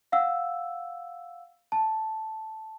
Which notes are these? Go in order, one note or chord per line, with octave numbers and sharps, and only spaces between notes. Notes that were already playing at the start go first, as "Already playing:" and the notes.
F5 F#5 E6
A5